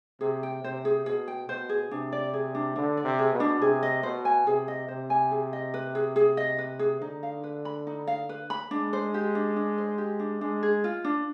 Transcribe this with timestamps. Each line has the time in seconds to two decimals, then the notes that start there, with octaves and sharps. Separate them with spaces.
0.21 C3 G#4
0.43 G5
0.64 C3 C5
0.85 G#4
1.06 B2 G#4
1.28 G5
1.49 B2 C5
1.69 G#4
1.91 C3 D4
2.13 D5
2.34 G#4
2.55 D4
2.76 D3 D4
2.97 D5
3.05 C3
3.19 G#4
3.33 B2
3.40 D4
3.61 C3 G#4
3.83 D#5
4.03 B2 C5
4.25 G#5
4.47 C3 G#4
4.68 D#5
4.88 C3 C5
5.10 G#5
5.31 G#4
5.53 D#5
5.74 B4
5.95 G#4
6.16 G#4
6.37 D#5
6.58 B4
6.79 G#4
7.01 D3 D#4
7.23 F5
7.44 B4
7.65 B5
7.87 D#4
8.07 F5
8.29 B4
8.50 B5
8.71 G#3 D4
8.93 C5
9.14 G4
9.35 D4
9.56 D4
9.78 C5
9.98 G4
10.19 D4
10.41 G#3 D4
10.63 G#4
10.84 F4
11.05 D4